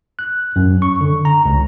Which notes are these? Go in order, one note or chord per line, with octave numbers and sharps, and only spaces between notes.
F#6
F#2
C#6
D3
A#5
C#2